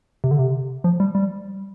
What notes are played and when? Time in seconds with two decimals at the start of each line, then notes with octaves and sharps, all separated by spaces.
0.24 C3
0.31 D3
0.39 C3
0.84 F3
1.00 G3
1.15 G3